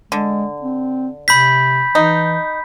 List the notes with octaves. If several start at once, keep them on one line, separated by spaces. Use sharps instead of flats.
D3 G#3
C4
C3 B5 G6 B6
E3 D#4